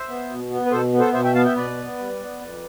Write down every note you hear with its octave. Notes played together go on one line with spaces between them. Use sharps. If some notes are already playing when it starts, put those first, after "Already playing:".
Already playing: C5 E5
B3
B2
B3
B4
B2 A4 C5
B3
A4 C5
B2 C5 E5
E5 G5
B3 F5 A5
E5 G5
B2 B4 D5
B3
G3
B3
F2